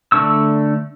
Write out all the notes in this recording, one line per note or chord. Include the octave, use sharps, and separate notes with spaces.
D3 A3 D4 C#6 E6